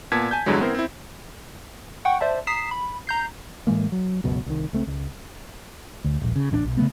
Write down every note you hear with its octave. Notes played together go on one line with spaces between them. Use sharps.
A#2 B3 A5 G#6 B6
G#5 A5 G6
E2 G2 D3 F#3 G#3
B3 C4 E4 A#4 C5
C4 E4
F#5 G5 C#6
C5 D5 E5 A5
A#5 D#6 B6 C7 E7
B5
A#5 G6 C7
A2 E3 G#3 A#3
F#3
C#2 F#2 B2
C2 D#3
C#2 A3 C4
C#2
D2
D#1 A#1
C#3
E1 A1 B2 D4
B1
C#3 F3 A3 B3